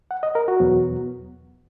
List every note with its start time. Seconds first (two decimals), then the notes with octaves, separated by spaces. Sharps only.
0.11 F#5
0.23 D#5
0.35 A#4
0.48 F#4
0.60 E2 B2 F#3 B3